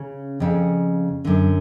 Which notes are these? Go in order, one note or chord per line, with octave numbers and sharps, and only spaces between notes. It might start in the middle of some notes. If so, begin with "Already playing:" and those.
Already playing: C#3 C#4
F2 C#3
F#2 D3